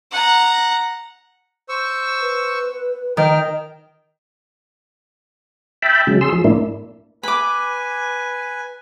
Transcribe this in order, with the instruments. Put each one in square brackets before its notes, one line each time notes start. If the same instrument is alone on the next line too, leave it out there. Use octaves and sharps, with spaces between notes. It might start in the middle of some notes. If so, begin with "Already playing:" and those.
[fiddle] F#5 A#5
[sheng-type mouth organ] C5 C#6 E6
[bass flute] B4
[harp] D#3 [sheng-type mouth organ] G5 F6
[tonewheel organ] E5 G5 A5 B5
C#3 F#3 G#3
G#4 C6 E6
F3
A2 A#3 D4 E4
[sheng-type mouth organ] B4 G#5 [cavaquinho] B5 D6